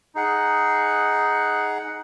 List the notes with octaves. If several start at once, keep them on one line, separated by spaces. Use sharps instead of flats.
D#4 G#4 F#5